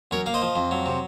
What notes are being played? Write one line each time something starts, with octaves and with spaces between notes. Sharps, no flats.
F#2 A#4 C#5
A#3 F5
C5 D#5
F3
F2
F#3
C3